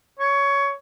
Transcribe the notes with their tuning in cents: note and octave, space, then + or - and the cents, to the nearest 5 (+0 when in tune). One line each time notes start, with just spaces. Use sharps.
C#5 +15